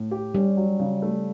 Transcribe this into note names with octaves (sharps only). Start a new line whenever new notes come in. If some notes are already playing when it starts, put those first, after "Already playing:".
Already playing: A2
G4
G3 C#4
F#3
C#3
A3